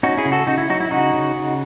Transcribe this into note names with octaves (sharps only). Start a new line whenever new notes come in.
C#4 D#4 F#4
E4 G#4
C#3
F#4 A4
C#3 D#4 F#4
E4
F#3 D#4 F#4
E4
C#3 D#4 F#4
C#3
C#3